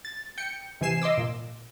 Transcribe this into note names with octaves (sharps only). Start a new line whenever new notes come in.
A6
G5 C#7
C3 E3 C4 G#5 C7 E7
D#5 C6 D6 E6
A#2